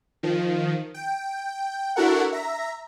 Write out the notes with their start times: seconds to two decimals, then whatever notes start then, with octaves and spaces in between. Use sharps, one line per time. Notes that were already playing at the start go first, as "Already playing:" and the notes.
0.23 D#3 F3
0.94 G5
1.96 D4 E4 F#4 A4 A#4 F#5
2.32 E5 A#5